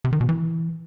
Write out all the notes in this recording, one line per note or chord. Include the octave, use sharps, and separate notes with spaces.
C3
D#3
B2
E3